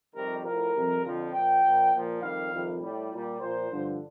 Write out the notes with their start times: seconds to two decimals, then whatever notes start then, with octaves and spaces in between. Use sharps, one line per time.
0.14 F2 C3 D#3 G3 A#4
0.44 A2 F3 A#4
0.75 F2 C3 G3
1.04 F2 D3 F3
1.33 A#2 F3 G5
1.62 A#2 F3
1.93 A#2 F3
2.22 F2 D#3 G3 F5
2.51 F2 C3 D#3 G3
2.80 A2 G3
3.10 A#2 G3
3.39 A#2 F3 C5
3.69 G2 D3 F3